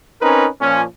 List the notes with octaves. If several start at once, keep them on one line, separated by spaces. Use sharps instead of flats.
C4 C#4 D#4 A#4 B4
A#2 F3 C#4